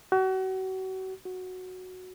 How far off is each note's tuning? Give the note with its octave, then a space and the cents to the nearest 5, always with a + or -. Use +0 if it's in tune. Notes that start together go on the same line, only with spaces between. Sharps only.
F#4 +35
F#4 -5